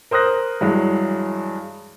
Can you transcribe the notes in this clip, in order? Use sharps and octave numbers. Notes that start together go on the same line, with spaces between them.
A#4 C5 D#6 F#6 A#6
G2 E3 F#3 G#3